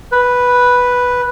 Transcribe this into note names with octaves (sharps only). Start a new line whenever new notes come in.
B4